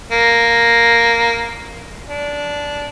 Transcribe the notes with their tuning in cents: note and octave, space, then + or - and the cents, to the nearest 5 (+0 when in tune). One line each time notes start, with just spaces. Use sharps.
A#3 +0
D4 -15